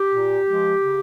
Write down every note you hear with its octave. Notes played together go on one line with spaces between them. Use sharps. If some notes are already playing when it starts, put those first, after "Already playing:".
Already playing: G4
A#2
F3 G#3
C#3